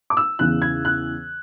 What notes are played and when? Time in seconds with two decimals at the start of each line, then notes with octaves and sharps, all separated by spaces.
0.10 D6
0.17 E6
0.39 E2 C#3 E3 F#6
0.62 G#6
0.85 F#6